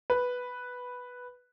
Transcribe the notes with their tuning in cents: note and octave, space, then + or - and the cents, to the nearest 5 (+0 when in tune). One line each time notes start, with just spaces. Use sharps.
B4 +0